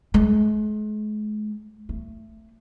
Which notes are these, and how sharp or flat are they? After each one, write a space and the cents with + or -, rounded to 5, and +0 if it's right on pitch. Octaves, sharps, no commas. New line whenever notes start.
G#3 +40
A3 +15